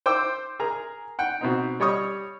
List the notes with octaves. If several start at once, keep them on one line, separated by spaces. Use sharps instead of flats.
C5 G5 D6 E6
G#4 A#4 A#5
F#5 G5
B2 C4 D#4
G3 C#5 D#5 C#6 D#6